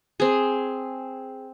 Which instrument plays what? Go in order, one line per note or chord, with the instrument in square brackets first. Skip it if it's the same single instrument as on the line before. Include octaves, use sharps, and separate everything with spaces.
[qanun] C4 G#4